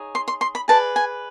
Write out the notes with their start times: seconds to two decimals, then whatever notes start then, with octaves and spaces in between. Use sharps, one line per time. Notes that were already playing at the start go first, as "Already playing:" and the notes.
Already playing: D#4 G#4 C#5
0.15 C6
0.28 C6
0.41 C6
0.55 B5
0.68 G#4 B4 D5 A5
0.96 G#5